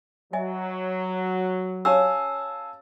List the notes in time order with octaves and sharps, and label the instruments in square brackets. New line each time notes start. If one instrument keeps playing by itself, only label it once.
[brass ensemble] F#3 [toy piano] D#5 E5 G#5
[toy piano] C#4 G4 C#5 [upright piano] F5 G#5 A5 [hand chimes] E6